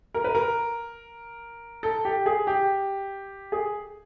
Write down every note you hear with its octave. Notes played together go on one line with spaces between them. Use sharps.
A#4
B4
A#4
A4
G4
G#4
G4
G#4